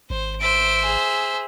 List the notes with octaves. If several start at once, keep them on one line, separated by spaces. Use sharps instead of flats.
G#1 C5
C5 E5 D7
G#4